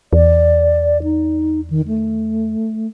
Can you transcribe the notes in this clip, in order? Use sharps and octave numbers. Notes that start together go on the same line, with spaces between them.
E2 D5
D#4
D#3
A3